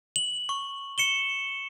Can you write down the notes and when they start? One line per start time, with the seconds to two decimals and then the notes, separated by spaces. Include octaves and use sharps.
0.16 F#7
0.49 C#6
0.98 C#7 E7 G7